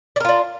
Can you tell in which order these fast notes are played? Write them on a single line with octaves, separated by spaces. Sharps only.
D5 A#4 F4 D4